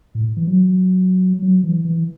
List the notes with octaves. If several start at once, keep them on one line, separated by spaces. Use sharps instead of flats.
A2
E3
F#3
F#3
E3
E3